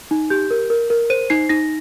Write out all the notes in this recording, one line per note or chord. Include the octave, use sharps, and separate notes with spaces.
D#4
G4 G6
A#4
A#4
A#4
C5 D#7
D#4 C7
D#4 A#6